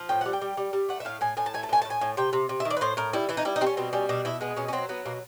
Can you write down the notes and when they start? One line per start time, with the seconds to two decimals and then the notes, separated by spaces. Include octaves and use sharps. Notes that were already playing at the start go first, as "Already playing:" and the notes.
Already playing: F3
0.09 A2 G5
0.21 G3 F#5
0.33 G5
0.42 G3
0.57 G3
0.73 G3
0.89 A3 F#5
1.00 E5
1.05 A2 F5
1.21 A2 G#5
1.37 A2 G#5
1.46 A5
1.54 A3 G#5
1.63 A5
1.69 A2 G#5
1.82 A5
1.85 A2
1.90 G#5
2.01 A2
2.17 C3 G5
2.33 C3
2.49 C3
2.60 E5
2.65 D#3
2.70 D5
2.77 B4
2.81 A2 C5
2.97 A2 A#4
3.13 G3 E4
3.29 E3 E4
3.37 D#4
3.45 G3 E4
3.56 D#4
3.61 G3 C4
3.66 C#4
3.77 B2 C4
3.93 G3 C#4
4.09 B2 D4
4.25 B2 E4
4.41 G#3 B3
4.57 B2 C#4
4.68 C#4
4.73 F#3 C4
4.89 F#3 B3
5.05 B2 A#3